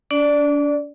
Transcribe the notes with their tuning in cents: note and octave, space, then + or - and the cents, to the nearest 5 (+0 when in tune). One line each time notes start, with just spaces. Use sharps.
D4 -35 D5 +0